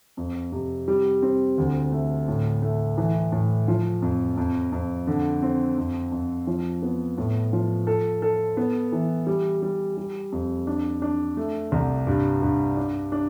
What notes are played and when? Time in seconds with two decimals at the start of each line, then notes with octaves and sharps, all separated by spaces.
0.17 F2
0.52 C3
0.88 G3
1.22 C4
1.58 D2
1.92 A3
2.28 A2
2.62 A3
2.98 E3
3.32 A2
3.68 F3
4.02 F2
4.37 F2
4.72 F2
5.07 D3
5.42 C4
5.78 F2
6.12 F2
6.47 F3
6.82 B3
7.18 A2
7.53 F3
7.87 A4
8.22 A4
8.57 B3
8.92 E3
9.27 G3
9.62 G3
9.97 G3
10.32 F2
10.67 D4
11.02 D4
11.37 A3
11.72 C2
12.07 G2
12.42 G2
12.77 D4
13.12 D4